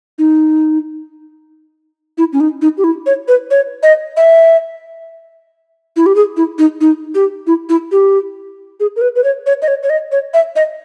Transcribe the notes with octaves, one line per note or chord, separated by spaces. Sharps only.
D#4
E4
C#4
D#4
D#4
G4
E4
C#5
B4
C#5
D#5
E5
E4
G4
G#4
E4
D#4
D#4
G4
E4
E4
G4
G#4
A#4
B4
B4
C#5
C#5
D#5
C#5
C#5
D#5
C#5
E5
D#5